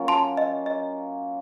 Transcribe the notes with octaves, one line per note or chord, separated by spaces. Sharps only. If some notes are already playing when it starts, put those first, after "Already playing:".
Already playing: F#3 A#3 C#4 F4
A5 C6
D#5
D#5